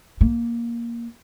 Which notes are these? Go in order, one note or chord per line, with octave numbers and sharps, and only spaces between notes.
A#3